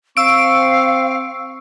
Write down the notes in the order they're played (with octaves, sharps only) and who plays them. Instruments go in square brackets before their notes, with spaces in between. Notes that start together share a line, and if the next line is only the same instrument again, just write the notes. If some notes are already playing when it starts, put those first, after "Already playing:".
[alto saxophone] C4 [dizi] F5 [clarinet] C#6 [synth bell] E6 D7